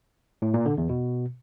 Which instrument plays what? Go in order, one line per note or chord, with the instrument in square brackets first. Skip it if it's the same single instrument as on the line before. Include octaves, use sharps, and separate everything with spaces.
[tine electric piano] A2
A#2
D3
E2
B2